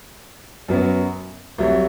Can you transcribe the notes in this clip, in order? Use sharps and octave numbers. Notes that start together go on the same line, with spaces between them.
F#2 F#3 B3
C2 C3 F#3